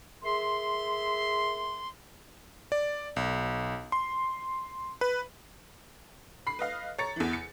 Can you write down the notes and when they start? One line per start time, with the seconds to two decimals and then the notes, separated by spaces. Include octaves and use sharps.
0.23 G#4 A#4 E5 C6
2.72 D5
3.16 B1
3.92 C6
5.01 B4
6.47 B5 C7
6.59 B4 D#5 F5
6.98 C#5 A#5 A6 C#7
7.16 E2 E3
7.33 C#7